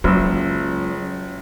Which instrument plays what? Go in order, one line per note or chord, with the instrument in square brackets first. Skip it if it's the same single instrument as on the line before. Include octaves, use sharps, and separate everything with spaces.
[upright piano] F#1 E6 [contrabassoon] C#2 [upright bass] F#3